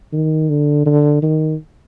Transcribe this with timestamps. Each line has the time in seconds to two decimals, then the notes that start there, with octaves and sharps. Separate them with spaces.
0.13 D#3
0.49 D3
0.86 D3
1.22 D#3